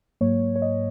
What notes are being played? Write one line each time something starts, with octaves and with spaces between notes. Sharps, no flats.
G#2 F#3 A#3 C#5
C#5
D#5